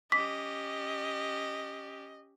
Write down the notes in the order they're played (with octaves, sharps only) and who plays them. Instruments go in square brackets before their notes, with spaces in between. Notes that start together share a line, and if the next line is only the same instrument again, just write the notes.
[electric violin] C#4 G4 [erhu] D#5 [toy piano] D6 [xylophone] B6